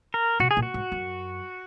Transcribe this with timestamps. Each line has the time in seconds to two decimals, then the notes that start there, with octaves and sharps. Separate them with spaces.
0.14 A#4
0.40 B2 F#4
0.51 G#4
0.57 A#2
0.63 F#4
0.74 G#2
0.92 F#2